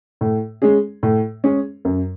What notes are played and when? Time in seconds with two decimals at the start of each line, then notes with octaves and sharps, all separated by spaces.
0.21 A2
0.62 G#3 C#4 G#4
1.03 A2
1.44 G#3 C#4 G#4
1.85 F#2